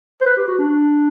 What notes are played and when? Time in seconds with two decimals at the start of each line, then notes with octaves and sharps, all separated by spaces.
0.21 C5
0.26 B4
0.37 G4
0.48 F#4
0.58 D4